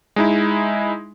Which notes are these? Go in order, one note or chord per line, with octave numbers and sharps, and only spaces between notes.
G#3 D#4 E4